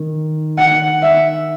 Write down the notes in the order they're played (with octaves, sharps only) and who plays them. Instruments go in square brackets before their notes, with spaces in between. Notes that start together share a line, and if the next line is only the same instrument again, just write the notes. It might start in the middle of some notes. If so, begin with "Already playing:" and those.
Already playing: [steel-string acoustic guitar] D#3
[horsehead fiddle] F#5
E5